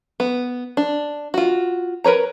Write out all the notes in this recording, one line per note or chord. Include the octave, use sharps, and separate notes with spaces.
B3
D4
F4 F#4
A#4 B4 C#5 A#5